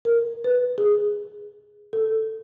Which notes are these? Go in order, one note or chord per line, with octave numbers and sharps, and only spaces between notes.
A#4
B4
G#4
A4